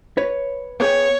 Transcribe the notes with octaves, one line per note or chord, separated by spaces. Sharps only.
B4 C#5
B3 G#4 C#5 G5